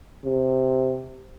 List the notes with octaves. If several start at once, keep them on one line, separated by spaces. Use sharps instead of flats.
C3